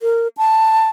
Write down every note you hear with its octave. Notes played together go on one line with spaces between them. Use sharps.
A#4
A5